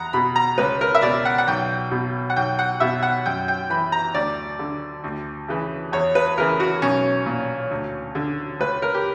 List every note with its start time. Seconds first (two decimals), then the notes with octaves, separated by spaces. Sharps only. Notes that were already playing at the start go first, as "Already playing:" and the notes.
Already playing: E2 F#5 A#5
0.13 B2 B5
0.36 A#5
0.58 C#2 B4
0.81 A#4
0.95 E5
1.02 B2 D5
1.25 F#5
1.38 F#5
1.47 B1 G5
1.91 B2
2.30 F#5
2.36 B1 G5
2.59 F#5
2.80 B2 E5
3.03 F#5
3.26 F#2 G5
3.48 G5
3.70 E3 B5
3.92 A#5
4.14 D2 D5
4.59 D3
5.04 D2
5.48 C#3 E3
5.92 E2 C#5
6.15 B4
6.38 C#3 E3 A#4
6.60 F#4
6.82 B1 C#4
7.26 A#2
7.71 D2
8.15 D3
8.59 C#2 B4
8.82 A#4
8.94 G4